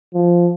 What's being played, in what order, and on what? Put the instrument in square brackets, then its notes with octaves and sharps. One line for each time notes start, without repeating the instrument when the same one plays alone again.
[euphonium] F3